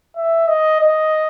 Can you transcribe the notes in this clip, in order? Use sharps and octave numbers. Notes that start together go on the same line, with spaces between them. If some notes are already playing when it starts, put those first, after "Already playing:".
E5
D#5
D#5